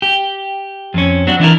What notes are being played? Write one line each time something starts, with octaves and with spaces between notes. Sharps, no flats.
G4
F2 C4 C#4
F#3 C4 D4 F#4
E3 D4 E4 A#4